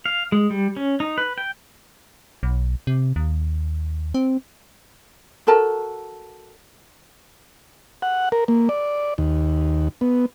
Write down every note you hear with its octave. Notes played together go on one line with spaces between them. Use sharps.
F5
G#3
G3
C#4
D#4
B4
G5
B1
C3
D#2
C4
F#4 A4 A#4 A5
F#5
A#4
A#3
D5
D#2
B3